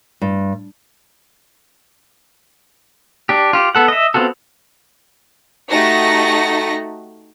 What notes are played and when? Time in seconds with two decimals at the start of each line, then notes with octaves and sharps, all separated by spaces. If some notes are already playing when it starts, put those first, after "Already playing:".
0.22 G2
3.29 D4 G4
3.53 F4 G4
3.75 B3 A4 F#5
3.88 D#5 E5
4.14 B3 C4 F4 F#4 A4
5.69 A3 D#4 F#4 G4 A#6 C#7